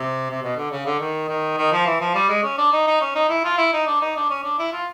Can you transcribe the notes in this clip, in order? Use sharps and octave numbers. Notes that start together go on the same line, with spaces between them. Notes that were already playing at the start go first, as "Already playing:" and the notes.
Already playing: C3
C3
B2
D3
C#3
D3
D#3
D#3
D#3
F3
E3
F3
G3
G#3
C#4
D4
D#4
D#4
C#4
D#4
E4
F4
E4
D#4
D4
D#4
D4
C#4
D4
E4
F4